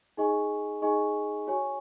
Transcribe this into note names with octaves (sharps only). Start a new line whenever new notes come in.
D#4 G#4 D#5 G#5 C#6
D#4 G#4 D#5 G#5 C#6
F#4 C#5 G#5 C#6